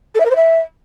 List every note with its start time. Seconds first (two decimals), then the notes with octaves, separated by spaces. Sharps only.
0.15 A4
0.20 E5
0.25 A#4
0.30 C5
0.36 E5